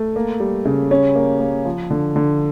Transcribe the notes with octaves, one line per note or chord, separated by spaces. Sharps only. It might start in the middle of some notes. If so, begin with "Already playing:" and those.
Already playing: A3
A#3
G3
C#3
C#4
A#3
A#3
F3
D3
D3